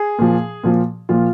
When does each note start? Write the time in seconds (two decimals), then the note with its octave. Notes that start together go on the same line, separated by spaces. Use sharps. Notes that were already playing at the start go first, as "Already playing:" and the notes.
Already playing: G#4
0.19 A#2 F3
0.64 A#2 F3
1.09 A#2 F3 F4